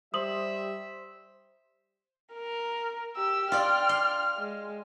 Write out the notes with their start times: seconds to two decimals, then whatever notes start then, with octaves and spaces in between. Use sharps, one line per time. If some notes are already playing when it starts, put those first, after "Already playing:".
0.14 G3 C5 E5 D#6 F#7
2.34 A#4
3.17 G4 E6
3.52 F4 D5 G5 F6
3.89 C6
4.38 G#3